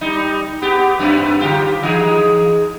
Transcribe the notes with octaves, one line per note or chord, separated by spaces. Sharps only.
G3 D#4
B3 G4
F#2 C4 B4
D3 F4 G4
E3 D#4 G#4